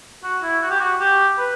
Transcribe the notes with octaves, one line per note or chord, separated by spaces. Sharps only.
F#4
E4
F#4
G4
F#4
G4
B4